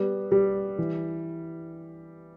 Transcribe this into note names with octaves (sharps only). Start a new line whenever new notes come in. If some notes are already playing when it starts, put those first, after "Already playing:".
Already playing: G3 B3
G3
E3